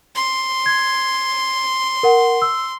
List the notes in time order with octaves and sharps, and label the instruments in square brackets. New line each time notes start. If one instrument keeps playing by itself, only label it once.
[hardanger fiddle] C6
[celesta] G#6
A#4 F#5
E6